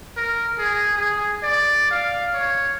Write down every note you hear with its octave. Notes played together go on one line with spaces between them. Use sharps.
A#4
G#4
G#4
D5
F5
C#5